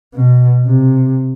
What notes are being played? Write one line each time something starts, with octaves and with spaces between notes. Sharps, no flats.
B2
C3